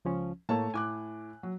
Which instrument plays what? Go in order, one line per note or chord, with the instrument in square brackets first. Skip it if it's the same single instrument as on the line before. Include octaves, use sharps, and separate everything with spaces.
[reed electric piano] C#2 F3 C#4
[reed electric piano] A2 A#3 [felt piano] A3 C#5 A5
[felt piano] A2 D6 F#6 [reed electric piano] G#5
[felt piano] F#3